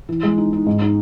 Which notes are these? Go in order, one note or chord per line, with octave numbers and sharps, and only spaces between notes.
E3
G#3
D#4
D#4
G#2
D#4